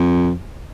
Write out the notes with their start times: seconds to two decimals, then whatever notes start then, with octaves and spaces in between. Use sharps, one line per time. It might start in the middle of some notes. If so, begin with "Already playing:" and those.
Already playing: F2